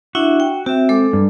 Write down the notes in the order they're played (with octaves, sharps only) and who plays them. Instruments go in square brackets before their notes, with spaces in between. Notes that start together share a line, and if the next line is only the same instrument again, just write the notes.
[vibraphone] D4 E4 E5 [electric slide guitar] F#4
[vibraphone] G5
[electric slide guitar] C4 [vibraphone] F#4 E5
[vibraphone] G#3 A4 D6
[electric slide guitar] G2